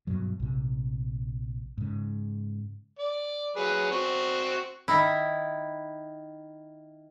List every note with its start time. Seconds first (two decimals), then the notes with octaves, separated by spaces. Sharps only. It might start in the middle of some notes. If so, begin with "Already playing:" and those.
0.07 G2 B2 F#3
0.40 A#1 C3
1.78 G#2 C#3
2.99 D5
3.56 F#3 G#4 B4
3.91 C4 F#4
4.88 D#3 D#4 E4